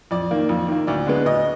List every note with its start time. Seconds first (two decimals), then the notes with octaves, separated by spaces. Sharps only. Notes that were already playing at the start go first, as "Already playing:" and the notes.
0.11 F2 D5
0.31 D#3 A#3
0.49 F2
0.68 D#3 A#3
0.87 D2 D5
1.07 D3 G#3 B3
1.26 D2 D#5